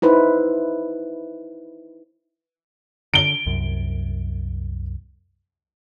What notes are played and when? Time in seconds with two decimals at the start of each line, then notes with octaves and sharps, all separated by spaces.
0.02 D#4 E4 B4 C5
3.14 D3 D7 G7
3.46 C2 F#2